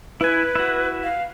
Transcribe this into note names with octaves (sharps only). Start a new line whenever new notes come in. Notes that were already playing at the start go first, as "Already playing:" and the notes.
E4 B4 G#5
E4 F#4
F5